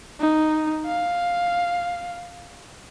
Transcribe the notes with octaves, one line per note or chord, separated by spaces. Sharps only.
D#4
F5